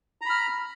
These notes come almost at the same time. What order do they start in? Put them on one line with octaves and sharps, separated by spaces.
A#5 B5 F6